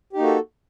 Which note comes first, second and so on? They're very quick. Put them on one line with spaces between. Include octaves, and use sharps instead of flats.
G4 D#4 A#3 F#4 A4